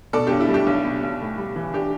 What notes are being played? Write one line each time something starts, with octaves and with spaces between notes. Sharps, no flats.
B2 A4 D5
B1 D4 G4
E4
G3
D4 G4
B1
B2
B1
A2
G3
E3
D4 G4